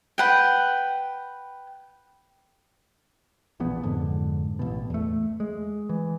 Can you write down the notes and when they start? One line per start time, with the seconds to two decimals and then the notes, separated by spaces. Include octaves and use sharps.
0.18 B4 F#5 G5
3.60 E1 A#1 E2 B3
3.83 F2 G#2 D3
4.59 A1 B2
4.90 E2 A3
5.40 G#3
5.89 E3